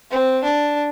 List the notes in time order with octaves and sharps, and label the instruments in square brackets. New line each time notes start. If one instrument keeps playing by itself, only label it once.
[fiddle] C4
D4